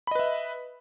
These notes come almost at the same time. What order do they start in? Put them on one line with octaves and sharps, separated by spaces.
B5 D#5 B4 E5